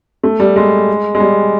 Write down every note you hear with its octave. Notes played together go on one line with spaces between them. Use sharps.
A3
G3
G#3
G#3
G3